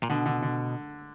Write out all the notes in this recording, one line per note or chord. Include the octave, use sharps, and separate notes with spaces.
A#2
B2 D3
D3
D3